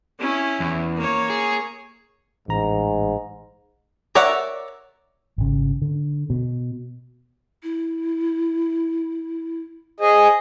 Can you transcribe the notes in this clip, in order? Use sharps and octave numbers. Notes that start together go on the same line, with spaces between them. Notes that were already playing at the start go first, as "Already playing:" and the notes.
C#4 E4
E2
A#3 C#5
G#4
A1 G#2 A#5
A#4 C#5 D5 E5 F#5
G#1 C#3
D3
B2
E4
G#4 C5 D#5